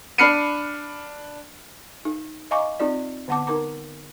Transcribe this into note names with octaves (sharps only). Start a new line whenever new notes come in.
D4 B5 F6 C7 C#7 D#7
D#4
D#5 F5 G#5 A#5 C#6 D6
C4 D#4 F4 D5
D3 B3 F#5 A5 D6
D#4 A#4 A#5 D6